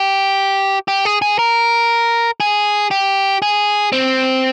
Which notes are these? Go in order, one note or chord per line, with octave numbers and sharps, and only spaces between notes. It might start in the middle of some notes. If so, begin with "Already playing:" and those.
Already playing: G4
G4
G#4
G#4
A#4
G#4
G4
G#4
C4